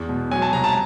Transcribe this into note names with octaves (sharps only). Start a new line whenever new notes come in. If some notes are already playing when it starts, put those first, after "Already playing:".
Already playing: E2
B2
F#3 G#5
A5
C2 A#5
A5